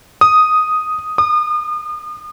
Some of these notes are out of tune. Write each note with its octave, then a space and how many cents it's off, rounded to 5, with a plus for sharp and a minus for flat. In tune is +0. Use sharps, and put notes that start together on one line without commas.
D#6 +0
D#6 -40